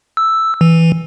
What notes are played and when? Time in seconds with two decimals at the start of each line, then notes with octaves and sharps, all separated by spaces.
0.17 E6
0.61 E3